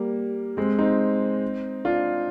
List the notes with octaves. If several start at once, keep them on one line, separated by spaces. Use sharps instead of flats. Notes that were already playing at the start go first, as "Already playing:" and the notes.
Already playing: G3 A#3
G#3 C4
C4 D#4
D4 F4